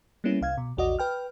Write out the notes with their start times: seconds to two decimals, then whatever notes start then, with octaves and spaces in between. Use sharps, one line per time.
0.24 G3 A#3 B3 C#4 E4
0.41 C2 F5 G#6
0.57 B2
0.77 A#1 E2 F#4 D5 D#5
0.99 B4 G5 F6